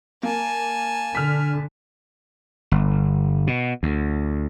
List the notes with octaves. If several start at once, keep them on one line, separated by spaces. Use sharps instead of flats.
A#3 G#5 A5
D3 F6 B6
G1
B2
D2